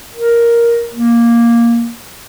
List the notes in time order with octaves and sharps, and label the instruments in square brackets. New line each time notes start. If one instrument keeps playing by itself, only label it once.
[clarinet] A#4
A#3